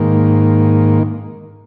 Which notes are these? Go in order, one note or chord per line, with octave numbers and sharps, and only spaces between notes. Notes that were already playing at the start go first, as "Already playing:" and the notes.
Already playing: G#2 D#3 A#3